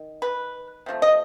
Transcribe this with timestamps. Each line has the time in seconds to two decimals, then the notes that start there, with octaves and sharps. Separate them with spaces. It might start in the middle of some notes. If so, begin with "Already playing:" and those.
Already playing: D#3
0.22 B4
0.86 C3 F3 A3
1.02 D#5